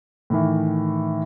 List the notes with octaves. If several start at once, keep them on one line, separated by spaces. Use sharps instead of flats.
A2 D#3 E3